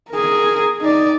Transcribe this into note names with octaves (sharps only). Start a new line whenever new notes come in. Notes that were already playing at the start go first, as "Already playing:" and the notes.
G#4 A#4
D#4 D5